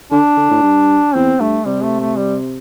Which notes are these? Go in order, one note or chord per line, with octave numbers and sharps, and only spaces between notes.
D3 D4
D3
A2
G2
E2 C4
G2 A3
C3 G3
A3
A3
G3